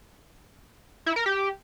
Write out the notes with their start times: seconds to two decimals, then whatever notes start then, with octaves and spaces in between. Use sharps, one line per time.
1.06 E4
1.16 A#4
1.26 G4